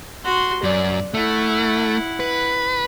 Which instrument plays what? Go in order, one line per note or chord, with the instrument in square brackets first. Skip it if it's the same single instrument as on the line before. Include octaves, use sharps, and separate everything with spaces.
[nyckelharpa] F#4 C6
[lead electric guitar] F#2 [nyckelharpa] D5
[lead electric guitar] A3 [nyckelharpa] E4 F#5
[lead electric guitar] B4